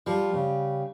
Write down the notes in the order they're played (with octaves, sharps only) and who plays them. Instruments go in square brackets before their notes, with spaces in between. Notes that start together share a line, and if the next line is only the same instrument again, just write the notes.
[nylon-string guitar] F3 [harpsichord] G3
[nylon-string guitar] C#3